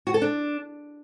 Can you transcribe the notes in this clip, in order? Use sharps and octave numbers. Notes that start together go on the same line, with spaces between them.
F#4
A4
D4